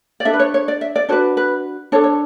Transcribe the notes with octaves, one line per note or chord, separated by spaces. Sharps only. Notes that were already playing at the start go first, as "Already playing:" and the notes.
D5
D4 A4 E5
B4
C#5
C#5
D5
E5
D5
D4 F#4 B4 C#5
B4
D4 A4 C#5
C#5